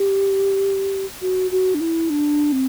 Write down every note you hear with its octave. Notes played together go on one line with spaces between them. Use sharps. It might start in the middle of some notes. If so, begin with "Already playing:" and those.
Already playing: G4
F#4
F#4
D4
E4
D4
C4